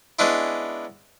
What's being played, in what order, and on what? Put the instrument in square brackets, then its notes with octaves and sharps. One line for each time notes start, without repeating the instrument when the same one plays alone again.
[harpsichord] G#3 B3 C#4 D4 E4